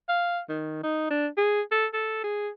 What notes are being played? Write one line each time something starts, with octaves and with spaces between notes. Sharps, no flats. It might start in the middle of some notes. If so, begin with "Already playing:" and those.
F5
D#3
D#4
D4
G#4
A4
A4
G#4